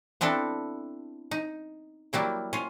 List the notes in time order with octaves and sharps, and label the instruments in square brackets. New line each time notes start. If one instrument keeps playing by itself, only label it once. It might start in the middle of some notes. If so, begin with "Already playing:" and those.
[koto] B3 C4 D4 E4 A4
D#4
F#3 G3 A#3 E4
C#4 F4